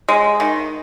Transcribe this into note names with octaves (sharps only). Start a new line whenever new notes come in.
G#3
D#3